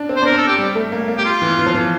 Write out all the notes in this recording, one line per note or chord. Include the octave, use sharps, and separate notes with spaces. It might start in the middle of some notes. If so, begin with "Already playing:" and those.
Already playing: D4
C4
C5
D4
C4 A#4
A4
G4
G3
A3
A#3
A#3
G4
F4
E3
E3
F3
E3